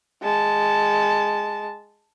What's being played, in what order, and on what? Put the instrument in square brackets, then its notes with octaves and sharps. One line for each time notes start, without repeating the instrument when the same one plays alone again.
[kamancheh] G#3 A5